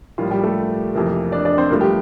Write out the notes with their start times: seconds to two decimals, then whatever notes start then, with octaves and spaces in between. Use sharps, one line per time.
0.18 A2 F3 G3 A#3 F4
0.31 G3 G4
0.43 A3 A4
0.95 F2 C3 E3 A#3
1.32 D4 D5
1.45 D4 D5
1.58 C4 C5
1.70 G2 F3 A3 A#3 A#4
1.81 G4